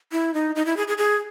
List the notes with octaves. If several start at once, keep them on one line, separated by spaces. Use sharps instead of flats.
E4
D#4
D#4
E4
G#4
G#4
G#4